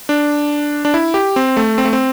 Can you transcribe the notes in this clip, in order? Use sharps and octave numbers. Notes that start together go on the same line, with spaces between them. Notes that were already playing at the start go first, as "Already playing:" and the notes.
D4
D4
E4
G4
C4
A3
C4
A3
C4